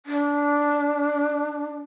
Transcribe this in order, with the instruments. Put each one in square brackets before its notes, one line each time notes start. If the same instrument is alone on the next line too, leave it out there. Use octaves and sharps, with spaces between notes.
[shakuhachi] D4